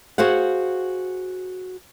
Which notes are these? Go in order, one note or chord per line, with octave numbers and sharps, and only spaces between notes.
F#4 G#4 C5 F5 F#5